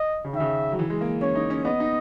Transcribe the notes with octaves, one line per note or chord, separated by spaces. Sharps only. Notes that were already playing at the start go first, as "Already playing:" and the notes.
Already playing: D#5
C#3
D#3
C#3 E5
F#3
E3
G#3
A#3
C#4 C#5
D#4
C#4
B3 D#5
D#4